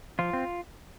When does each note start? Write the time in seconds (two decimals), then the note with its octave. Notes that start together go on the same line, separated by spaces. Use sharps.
0.19 F3 F4
0.33 C4